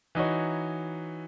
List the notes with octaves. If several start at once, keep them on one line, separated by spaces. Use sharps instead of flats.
E3 D#4 F#4 C#5